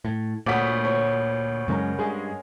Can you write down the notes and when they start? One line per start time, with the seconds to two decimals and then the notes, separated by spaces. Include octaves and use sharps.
0.05 A2
0.46 D2 A#2 C#5 F#5 D#6 B6
0.85 C#5
1.68 F#2 C#3 G#3 C#4 A#4
1.99 G2 G#3 G#4